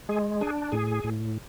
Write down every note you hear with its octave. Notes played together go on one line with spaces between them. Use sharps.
G#3 G#4
D4 G#4
A2 G#4
A2